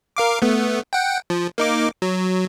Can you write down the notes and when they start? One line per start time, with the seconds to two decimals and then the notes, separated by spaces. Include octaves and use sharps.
0.17 A#4 F5 D6
0.42 A3 B3
0.93 F#5 G5
1.30 F3
1.58 A#3 D#4 D6
2.02 F#3